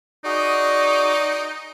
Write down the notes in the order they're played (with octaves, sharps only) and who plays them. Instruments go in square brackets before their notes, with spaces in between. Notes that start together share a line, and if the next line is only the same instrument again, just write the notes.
[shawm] D#4 [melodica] F#4 G#4 [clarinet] D5